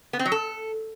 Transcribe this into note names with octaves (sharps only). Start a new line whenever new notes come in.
B3
C4
F#3
A4